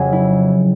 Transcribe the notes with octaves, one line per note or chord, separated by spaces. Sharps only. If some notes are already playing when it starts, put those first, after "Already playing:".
Already playing: F2 C#3 F#3 G#4
E4